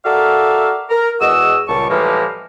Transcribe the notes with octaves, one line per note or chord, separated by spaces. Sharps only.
F#4 A4 A#4 D5 E5 F5
A#4
E2 G#3 F#4 D#5 E6
C#2 A#2 G3 A5 C#6
A2 E3 F3 G3 G#3 A#3